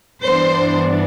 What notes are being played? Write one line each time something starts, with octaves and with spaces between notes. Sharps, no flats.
G2 E3 B3 D4 C5